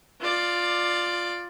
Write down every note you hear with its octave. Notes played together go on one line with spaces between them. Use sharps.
F4 D5